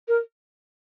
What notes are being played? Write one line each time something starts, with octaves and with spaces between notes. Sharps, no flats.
A#4